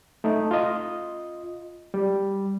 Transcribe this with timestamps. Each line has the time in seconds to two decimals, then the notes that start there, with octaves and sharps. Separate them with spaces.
0.24 A3 D#4
0.51 F4 D#5
1.94 G3